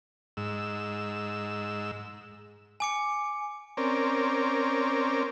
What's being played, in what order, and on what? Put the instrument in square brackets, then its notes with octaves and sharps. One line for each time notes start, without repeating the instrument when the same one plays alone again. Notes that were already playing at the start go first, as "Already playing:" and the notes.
[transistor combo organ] G#2 E6
[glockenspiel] G#5 D6 C#7
[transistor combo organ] C4 C#4 A#4 D5